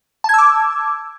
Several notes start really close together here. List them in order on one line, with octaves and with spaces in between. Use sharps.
A5 G#6 E6 D6